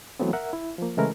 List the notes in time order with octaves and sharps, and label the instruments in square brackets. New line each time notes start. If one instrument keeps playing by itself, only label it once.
[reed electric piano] E3 F#3 A3 B3 C4
A#4 E5 F#5
E4
F3 A#3
C#3 E3 G#3 A3 E4 A#4